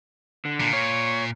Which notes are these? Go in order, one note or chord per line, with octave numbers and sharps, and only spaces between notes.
D3
A#2
C#5